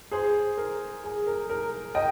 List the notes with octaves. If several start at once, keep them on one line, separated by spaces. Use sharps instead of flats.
G#4 C5
A#4
G#4
A#4
A#4
D#5 G5